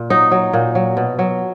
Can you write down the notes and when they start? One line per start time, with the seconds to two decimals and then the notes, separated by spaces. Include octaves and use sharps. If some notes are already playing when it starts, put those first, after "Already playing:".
Already playing: A#2
0.10 F#3 D#4
0.31 F#3
0.53 A#2
0.75 F#3
0.97 B2
1.19 F#3